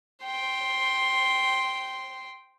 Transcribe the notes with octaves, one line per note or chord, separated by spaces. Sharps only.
G5 C6